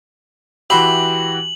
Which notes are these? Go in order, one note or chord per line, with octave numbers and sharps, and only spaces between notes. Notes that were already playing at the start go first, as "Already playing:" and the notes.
E3 F#4 G4 E5 B5 C6 F#7